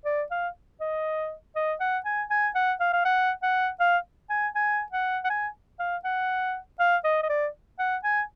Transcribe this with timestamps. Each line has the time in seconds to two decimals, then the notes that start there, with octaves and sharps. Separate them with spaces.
0.05 D5
0.31 F5
0.80 D#5
1.56 D#5
1.80 F#5
2.05 G#5
2.30 G#5
2.55 F#5
2.80 F5
2.93 F5
3.05 F#5
3.43 F#5
3.80 F5
4.30 G#5
4.55 G#5
4.92 F#5
5.24 F#5
5.30 G#5
5.80 F5
6.04 F#5
6.79 F5
7.04 D#5
7.23 D#5
7.29 D5
7.79 F#5
8.04 G#5